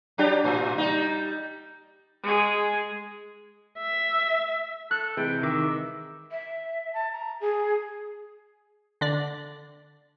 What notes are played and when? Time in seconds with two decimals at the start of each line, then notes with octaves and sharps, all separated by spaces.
0.18 F#3 D4 G4
0.44 A2
0.78 G3 D#4
2.23 G#3 G#4
3.79 E5
4.91 A4 F#6
5.17 C3 E3 G#3 G5
5.43 D#3 E5 D6
6.31 E5
6.93 A5
7.12 A#5
7.41 G#4
9.01 D3 D5